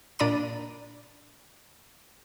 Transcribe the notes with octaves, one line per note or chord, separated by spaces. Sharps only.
A#2 D4 D5 A#5 B5 D#7